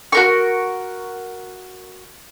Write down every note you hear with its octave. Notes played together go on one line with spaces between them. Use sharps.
F#4 A#4 C#6